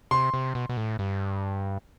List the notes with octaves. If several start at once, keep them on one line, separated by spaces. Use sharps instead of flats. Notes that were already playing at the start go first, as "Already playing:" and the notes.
C3 C6
C3
B2
B2
A2
G2